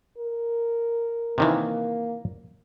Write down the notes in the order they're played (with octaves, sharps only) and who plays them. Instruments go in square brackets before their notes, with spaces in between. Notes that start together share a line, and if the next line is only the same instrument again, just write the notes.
[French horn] A#4
[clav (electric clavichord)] C3 D#3 E3 [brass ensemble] A#3